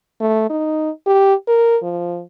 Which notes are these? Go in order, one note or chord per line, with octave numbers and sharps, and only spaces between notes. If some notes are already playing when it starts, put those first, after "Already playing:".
A3
D#4
G4
A#4
F3